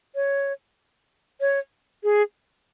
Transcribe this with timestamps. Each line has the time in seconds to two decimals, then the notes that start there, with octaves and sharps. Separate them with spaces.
0.15 C#5
1.41 C#5
2.04 G#4